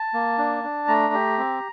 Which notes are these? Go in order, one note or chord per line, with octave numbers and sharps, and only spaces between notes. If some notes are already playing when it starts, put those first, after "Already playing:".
Already playing: A5
A#3
D4
D4
A3 A#5
G4
C4